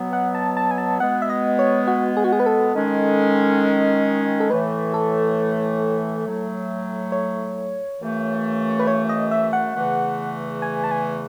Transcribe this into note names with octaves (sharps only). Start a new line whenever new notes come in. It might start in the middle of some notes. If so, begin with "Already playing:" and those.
Already playing: B2 F#3 B3
F#5
A5
A5
G#5
A5
B2 G#3 B3 F#5
E5
D#5
C#5
F#4
G#4
F#4
G#4
B4
A4
D#3 G#3 C#4
A4
A2 E3 A3 B4
A4
A2 F#3 A3
C#5
F#2 C#3 E3 A3
B4
C#5
D#5
E5
F#5
E2 C#3 E3 A3
G#5
A5
G#5